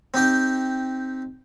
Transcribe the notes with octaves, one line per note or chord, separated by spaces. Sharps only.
C4 D#4 G4 G5